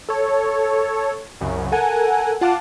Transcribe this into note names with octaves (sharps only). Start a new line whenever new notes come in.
A4 C#5
C2 F#2 C#3
A4 A#4 F#5 G#5
F4 F#5 A5 D6